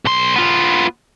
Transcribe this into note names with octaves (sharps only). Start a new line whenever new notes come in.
B1 C6
B3 F4